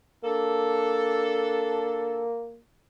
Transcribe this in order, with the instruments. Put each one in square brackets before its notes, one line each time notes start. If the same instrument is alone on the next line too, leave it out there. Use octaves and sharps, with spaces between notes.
[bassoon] A#3 [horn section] D4 A4